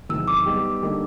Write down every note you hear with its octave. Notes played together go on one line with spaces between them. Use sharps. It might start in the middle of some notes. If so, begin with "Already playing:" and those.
E2 C3 D#3 F#3 E6
D6
G3 B3 D#4 G4
D3 G3 A#3 D#4